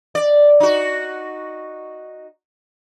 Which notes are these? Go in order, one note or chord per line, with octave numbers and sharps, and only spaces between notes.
D5
D#4 F#4